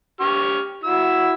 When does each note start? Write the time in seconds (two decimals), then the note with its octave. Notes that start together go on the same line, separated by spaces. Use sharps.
0.21 G4 C#6 F6
0.84 E4 F#4 E6